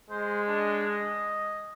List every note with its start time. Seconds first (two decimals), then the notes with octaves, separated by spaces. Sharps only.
0.10 G#3 C5
0.48 D4
0.87 D#5